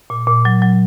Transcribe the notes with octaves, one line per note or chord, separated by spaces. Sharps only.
A#2
A#2
F#3
F#3